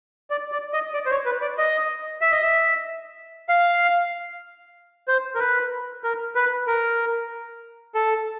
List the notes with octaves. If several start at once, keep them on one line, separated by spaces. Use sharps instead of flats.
D5
D5
D#5
D5
C5
C#5
B4
D5
D#5
E5
D#5
E5
F5
C5
A#4
B4
A#4
B4
A#4
A4